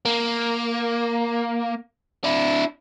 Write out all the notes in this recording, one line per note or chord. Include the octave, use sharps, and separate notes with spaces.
A#3
D4 E4